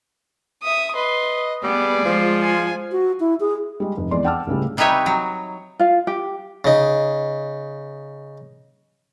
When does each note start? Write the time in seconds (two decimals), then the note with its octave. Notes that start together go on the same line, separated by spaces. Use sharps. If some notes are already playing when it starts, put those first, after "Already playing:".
0.63 E5 D#6
0.96 B4 D#5 C6
1.63 G3 B3 G#4 D5
2.05 F3 G#3 F4
2.42 G#5
2.92 F#4
3.20 E4
3.40 G#4
3.80 G3 G#3
3.97 F1
4.11 E2 G#3 D5 C6
4.24 F#5 G5 A5 D6 E6 F6
4.47 C#2 A2 C#3 G3
4.77 C3 G3 D#4 B4 C#5 E5
5.06 F#3
5.79 F4 F5
6.07 G4
6.64 C#3 D#4